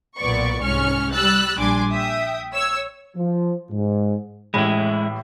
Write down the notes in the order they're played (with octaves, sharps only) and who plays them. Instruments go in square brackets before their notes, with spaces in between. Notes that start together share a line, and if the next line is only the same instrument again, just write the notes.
[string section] B1 A#2 B3 D5 C#6
C2 G#2 C#4 C#6 F6
G3 E6 F#6 A6
A#1 G3 D4 G#5 C6 D6
E5 G5 D#6
C#5 E6
[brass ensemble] F3
G#2
[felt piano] A1 A2 B5 [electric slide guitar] G#3 E4